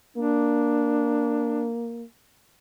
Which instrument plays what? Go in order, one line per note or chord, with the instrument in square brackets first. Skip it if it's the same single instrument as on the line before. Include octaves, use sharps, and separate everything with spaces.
[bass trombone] A#3 [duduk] D4